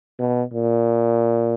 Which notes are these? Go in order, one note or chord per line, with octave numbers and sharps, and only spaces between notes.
B2
A#2